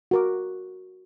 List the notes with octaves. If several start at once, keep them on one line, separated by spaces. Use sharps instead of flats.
F#4 A#4 D6